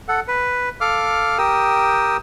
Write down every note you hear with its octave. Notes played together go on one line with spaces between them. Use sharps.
A4 F#5
B4
A4 F5 D6 F6
G4 A#4 G5 D#6 E6